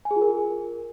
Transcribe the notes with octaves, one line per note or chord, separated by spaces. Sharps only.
G#5
G#4
F4
A#4